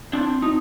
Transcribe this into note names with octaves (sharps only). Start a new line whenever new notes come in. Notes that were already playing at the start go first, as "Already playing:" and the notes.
C4 D4
D#4